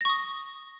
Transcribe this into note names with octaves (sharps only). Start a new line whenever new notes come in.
C#6 D#6 A#6